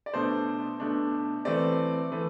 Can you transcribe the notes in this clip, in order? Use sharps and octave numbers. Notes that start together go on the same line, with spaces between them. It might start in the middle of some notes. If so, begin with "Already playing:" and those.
D5
B2 A3 D4 C5
B2 A3 D4
E3 A3 C4 D5
E3 A3